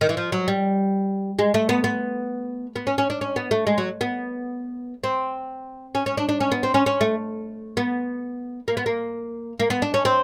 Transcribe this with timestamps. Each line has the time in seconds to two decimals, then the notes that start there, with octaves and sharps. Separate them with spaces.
0.01 D#3
0.09 E3
0.17 F3
0.32 F#3
0.48 G3
1.39 G#3
1.54 A3
1.69 B3
1.84 B3
2.76 B3
2.87 C#4
2.98 C#4
3.10 D4
3.21 C#4
3.36 B3
3.51 A3
3.67 G#3
3.78 F#3
4.01 B3
5.04 C4
5.95 C#4
6.06 C#4
6.17 D4
6.29 D4
6.40 C#4
6.52 B3
6.63 C4
6.74 C#4
6.86 C#4
7.01 A3
7.77 B3
8.68 A#3
8.77 B3
8.86 A#3
9.60 A#3
9.70 B3
9.82 D4
9.94 C#4
10.05 C4